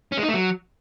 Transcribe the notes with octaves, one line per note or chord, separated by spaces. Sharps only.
C#4
G#3
D#4
A3
F#3